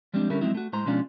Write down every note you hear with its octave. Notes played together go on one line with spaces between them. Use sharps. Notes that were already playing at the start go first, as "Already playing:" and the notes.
F3 G3 G#3 C4 D4
D3 G3 C#4 E4 A4 A#4
F3 F#3 G#3 C4 D#4 E4
A3 F#4
A2 G#3 C5 A#5 C6
B2 F3 G#3 C#4 D4 F4